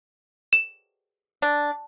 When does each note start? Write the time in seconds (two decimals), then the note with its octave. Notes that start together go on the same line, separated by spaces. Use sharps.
0.53 E7
1.42 D4